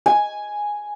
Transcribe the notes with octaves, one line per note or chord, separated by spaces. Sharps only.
G#5